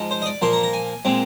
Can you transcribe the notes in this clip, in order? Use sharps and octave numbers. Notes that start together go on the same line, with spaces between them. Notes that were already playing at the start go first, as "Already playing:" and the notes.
Already playing: G#2 F3 G#3
C5
D#5
D5
A#2 F3 A#3 C6
A#5
A#5
G#5
A#2 G#3 C4